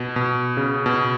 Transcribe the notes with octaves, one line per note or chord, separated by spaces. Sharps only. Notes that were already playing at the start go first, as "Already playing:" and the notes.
Already playing: B2
B2
C#3
B2